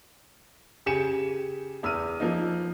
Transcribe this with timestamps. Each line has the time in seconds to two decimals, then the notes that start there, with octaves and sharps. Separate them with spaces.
0.86 C#3 G4 G#5 C#7 E7
1.83 E2 E6 F6 D#7
2.20 F3 A#3 D#4